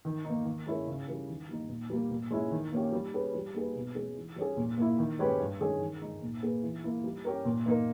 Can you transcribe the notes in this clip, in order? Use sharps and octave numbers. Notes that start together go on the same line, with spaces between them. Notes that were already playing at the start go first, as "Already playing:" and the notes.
D#3
A#3 D#4
D#3
G#3 C#4 E4 A#4
C#3
G3 C#4 E4 A#4
D#3
G3 A#3 D#4
A#2
G3 A#3
A#2
G#3 C#4 E4
D#3
A#3 C#4 G4
G3
C#4 G#4 B4
G3
A#3 D#4 G#4 B4
B2
G#3 C#4 G#4
E3
G3 C#4 G#4
A#2
A#3 E4
D#3
G#3 C#4 G4 B4
G2
D#3 G#3 C#4 G#4
D#3
G#3 D#4
A#2
A#3 D#4 G#4 B4
E3
A#3 E4
G3
C#4 G4 A#4
A#2
A#3 D#4 A#4